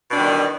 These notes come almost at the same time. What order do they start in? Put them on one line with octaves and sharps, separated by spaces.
B2 D4 G3 D#3 E3